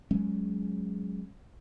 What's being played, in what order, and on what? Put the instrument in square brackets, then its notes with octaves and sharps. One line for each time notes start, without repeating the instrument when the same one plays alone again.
[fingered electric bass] F#3 G#3 C#4